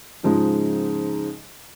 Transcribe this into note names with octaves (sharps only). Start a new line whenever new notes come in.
G#2 C#3 F3 G#3 D#4